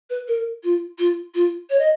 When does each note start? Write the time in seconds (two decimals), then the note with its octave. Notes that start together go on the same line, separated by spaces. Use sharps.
0.10 B4
0.28 A#4
0.64 F4
0.98 F4
1.34 F4
1.70 C#5
1.79 D#5